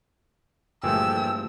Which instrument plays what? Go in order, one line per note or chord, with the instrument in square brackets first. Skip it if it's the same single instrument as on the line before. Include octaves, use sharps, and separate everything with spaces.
[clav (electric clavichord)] G1 E3 G#4 [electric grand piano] A#2 F3 A3 [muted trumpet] G5 [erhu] E6